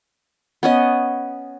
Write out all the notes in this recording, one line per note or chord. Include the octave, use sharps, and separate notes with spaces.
B3 C#4 D#5